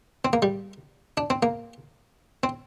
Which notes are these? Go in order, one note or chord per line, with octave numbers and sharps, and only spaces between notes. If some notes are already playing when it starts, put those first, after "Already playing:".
C4
A#3
G3
D4
C4
A#3
C4